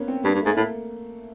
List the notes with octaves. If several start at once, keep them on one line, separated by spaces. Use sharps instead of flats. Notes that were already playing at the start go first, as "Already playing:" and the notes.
Already playing: A#3 B3 C#4
C4
G2 A#3
G2
G#2 A3
A2 A#3